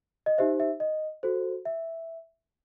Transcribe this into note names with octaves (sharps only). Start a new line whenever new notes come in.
D#5
D#4 G4 C5 E5
E5
D#5
F#4 A4 C5
E5